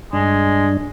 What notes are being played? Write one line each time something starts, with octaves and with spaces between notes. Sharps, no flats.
G2 G#3 D4